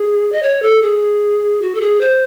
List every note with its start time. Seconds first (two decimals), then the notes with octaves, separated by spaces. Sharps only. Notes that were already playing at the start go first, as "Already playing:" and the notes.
Already playing: G#4
0.32 D#5
0.43 C#5
0.62 A4
0.82 G#4
1.62 F#4
1.75 A4
1.81 G#4
2.01 C5